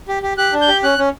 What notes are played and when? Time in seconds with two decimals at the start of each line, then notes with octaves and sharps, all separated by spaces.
0.08 G4
0.23 G4
0.37 G4 F#6
0.52 D4
0.61 G6
0.68 G4
0.83 C#4 F#6
0.98 C#4